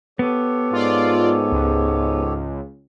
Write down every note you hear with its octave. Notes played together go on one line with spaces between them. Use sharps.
B3 G4 A4 C#5
G#2 F4 D5
C#2